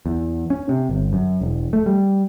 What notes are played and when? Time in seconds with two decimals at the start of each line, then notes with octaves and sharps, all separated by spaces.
0.06 E2
0.50 C#4
0.69 C3
0.89 G1
1.13 F#2
1.41 E1
1.73 A3
1.86 G3